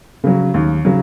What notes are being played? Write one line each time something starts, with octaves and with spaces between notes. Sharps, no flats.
C#3 F#3
D#2
C#3 F#3